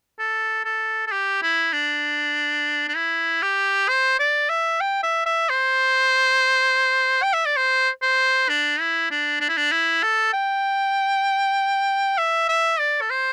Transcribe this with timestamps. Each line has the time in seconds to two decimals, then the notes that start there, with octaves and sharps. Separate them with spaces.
0.19 A4
0.65 A4
1.07 A4
1.12 G4
1.42 E4
1.73 D4
2.88 D4
2.96 E4
3.42 G4
3.88 C5
4.19 D5
4.49 E5
4.81 G5
5.03 E5
5.26 E5
5.49 C5
7.23 G5
7.34 E5
7.46 D5
7.57 C5
8.02 C5
8.49 D4
8.80 E4
9.11 D4
9.41 D4
9.49 E4
9.57 D4
9.72 E4
10.03 A4
10.33 G5
12.18 E5
12.49 E5
12.79 D5
13.01 A4
13.10 C5